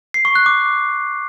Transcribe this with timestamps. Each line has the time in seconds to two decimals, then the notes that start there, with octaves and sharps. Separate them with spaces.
0.14 C7
0.25 C#6
0.35 F#6
0.46 D6